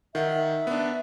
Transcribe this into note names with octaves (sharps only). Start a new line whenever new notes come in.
D#3 E5 F#5
B3 D4